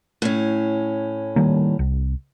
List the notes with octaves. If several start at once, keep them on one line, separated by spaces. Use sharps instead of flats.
A2 C#4
D#3 G3 A#3
C2